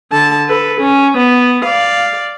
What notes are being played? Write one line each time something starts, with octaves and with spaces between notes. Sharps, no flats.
D3 A5
A4 B4
C#4
B3
D5 F5